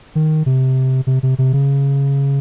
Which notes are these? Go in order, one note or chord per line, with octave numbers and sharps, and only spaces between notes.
D#3
C3
C3
C3
C3
C#3